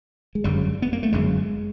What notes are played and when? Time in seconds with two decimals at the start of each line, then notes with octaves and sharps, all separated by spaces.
0.35 G#3
0.44 G1 F#2 C#3 G3
0.82 B3
0.93 A#3
1.03 A3
1.12 G1 F#2 C#3 G#3